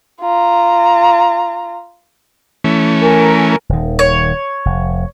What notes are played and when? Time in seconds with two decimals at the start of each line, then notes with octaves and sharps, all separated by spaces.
0.21 F4 A#5
2.64 E3 A3 C#4
3.01 A#4 G#5
3.69 D#1 D#3
3.99 C#5
4.65 F1